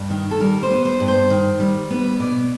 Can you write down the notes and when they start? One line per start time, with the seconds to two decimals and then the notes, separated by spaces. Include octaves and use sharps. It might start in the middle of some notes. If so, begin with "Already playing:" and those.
Already playing: G2
0.10 D#3
0.31 A4
0.40 G3 A#4
0.63 C5
0.71 B3
0.85 C5
1.00 G2
1.08 C5
1.30 D#3
1.60 G3
1.90 B3
2.20 B2 D5